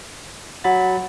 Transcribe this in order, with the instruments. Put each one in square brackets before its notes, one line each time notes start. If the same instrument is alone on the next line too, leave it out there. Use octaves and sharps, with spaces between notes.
[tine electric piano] F#3 B5 A6 [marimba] F#5